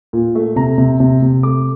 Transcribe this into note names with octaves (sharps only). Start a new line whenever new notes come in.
A#2
A3
C3 A#5
C3
C3
C3
A3 D6